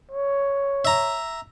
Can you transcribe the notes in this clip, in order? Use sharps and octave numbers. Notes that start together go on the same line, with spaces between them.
C#5
E5 A#5